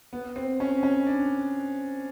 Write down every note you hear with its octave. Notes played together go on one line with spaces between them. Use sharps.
B3
C4
C#4
C#4
D4